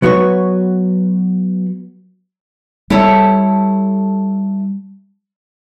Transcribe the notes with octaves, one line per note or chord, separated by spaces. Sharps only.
F#3 B3 F#4 B4 C#5
G3 E4 A4 C#5